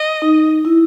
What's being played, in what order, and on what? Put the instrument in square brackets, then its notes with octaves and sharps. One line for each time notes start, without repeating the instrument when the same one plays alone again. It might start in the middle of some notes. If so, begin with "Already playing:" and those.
Already playing: [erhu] D#5
[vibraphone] D#4
E4